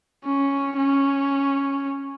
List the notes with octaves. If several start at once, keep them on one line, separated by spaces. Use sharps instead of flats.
C#4
C#4